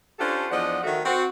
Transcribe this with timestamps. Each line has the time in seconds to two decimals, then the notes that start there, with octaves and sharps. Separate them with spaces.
0.19 C#4 D4 F4 G4 A4 C5
0.51 E2 F3 D4 D#5 F#5
0.84 D#3 A3 F#4
1.04 C4 F#4